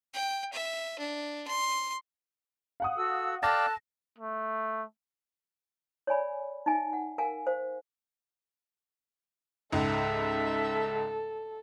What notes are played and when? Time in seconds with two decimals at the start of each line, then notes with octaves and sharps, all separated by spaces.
0.14 G5
0.53 E5
0.99 D4
1.48 C6
2.80 F5 F#5 D#6
2.97 F#4 A4 E6
3.43 A4 D5 F5 G5 A5 F#6 A#6
4.18 A3
6.07 C#5 D5 G#5 B5
6.66 D#4 E5 G#5
6.93 F#5
7.18 A#4 F5 G#5
7.47 C5 F5
9.73 C#2 G#2 A4 E5